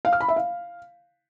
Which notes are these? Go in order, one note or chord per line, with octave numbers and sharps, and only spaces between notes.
F5
F6
B5
E5
F5